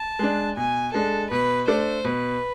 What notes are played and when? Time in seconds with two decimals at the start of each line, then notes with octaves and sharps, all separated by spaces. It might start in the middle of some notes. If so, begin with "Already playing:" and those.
Already playing: A5
0.19 G#3 D4
0.56 B2 G#5
0.93 G#3 D4 A4
1.31 B2 B4
1.67 A3 D4 A4 C5 D5
2.04 B2 B4